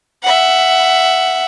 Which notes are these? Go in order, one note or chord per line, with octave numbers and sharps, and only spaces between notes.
E5 F#5